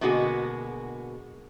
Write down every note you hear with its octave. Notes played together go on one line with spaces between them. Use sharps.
B2 D3 G#3 A#3 F#4 G#4